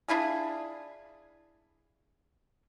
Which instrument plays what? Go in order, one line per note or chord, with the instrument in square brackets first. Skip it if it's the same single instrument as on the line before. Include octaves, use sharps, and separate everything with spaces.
[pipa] D4 E4 F4 G#4